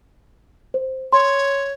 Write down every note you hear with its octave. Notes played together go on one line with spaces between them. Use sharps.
C5
C#5 C6